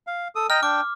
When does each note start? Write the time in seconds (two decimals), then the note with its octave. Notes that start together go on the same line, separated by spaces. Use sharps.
0.07 F5
0.36 A4 D#6
0.50 D#5 G5 A#5 F6
0.63 D4 G5 D6